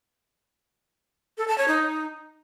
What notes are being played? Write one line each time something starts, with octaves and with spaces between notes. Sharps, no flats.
A4
A5
C#5
D#4